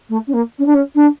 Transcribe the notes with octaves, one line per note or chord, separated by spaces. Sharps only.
A3
C#4
A#3
C#4
D4
C#4
D4